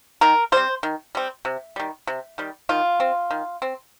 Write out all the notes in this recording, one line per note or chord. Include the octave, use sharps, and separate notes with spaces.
D#3 A#4
G3 C4 C5
D#3
G3 C4
C3
D#3 G3
C3
D#3 G3
D#3 F4
C4
D#3
C4